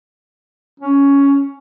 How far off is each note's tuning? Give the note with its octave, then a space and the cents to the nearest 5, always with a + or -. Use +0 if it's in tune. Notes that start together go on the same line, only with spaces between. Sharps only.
C#4 +10